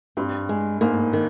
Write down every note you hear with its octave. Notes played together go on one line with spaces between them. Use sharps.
G2 C4
G#3
G#2 A#3
D#3